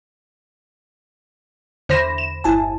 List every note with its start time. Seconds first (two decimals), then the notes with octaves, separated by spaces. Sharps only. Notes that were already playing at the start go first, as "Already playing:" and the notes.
1.89 E2 D3 C5 B5 A#6 E7
2.18 E7
2.44 G1 E4 G#5 A5